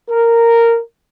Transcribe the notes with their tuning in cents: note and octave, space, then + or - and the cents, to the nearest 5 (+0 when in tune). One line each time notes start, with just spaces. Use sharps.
A#4 -10